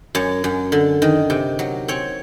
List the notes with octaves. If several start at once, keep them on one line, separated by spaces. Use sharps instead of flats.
F#2 C#5
F#2
D3
D#3
C3
F#3
C4 C#5